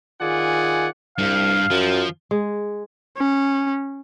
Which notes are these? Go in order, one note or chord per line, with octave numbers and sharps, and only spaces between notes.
D#3 F4 G#4 D5 F#5 G#5
C2 G2 F5
F#2 F3
G#3
C#4